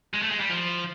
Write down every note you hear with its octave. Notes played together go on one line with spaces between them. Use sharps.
G#3
A3
G#3
G3
F3